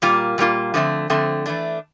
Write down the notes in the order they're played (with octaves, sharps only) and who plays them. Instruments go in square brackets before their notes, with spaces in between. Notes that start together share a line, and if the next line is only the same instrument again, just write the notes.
[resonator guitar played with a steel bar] A#2 G3 A#3 F4
A#2 G3 A#3 F4
D3 F3 A3 C4
D3 F3 A3 C4
E3 A3 D4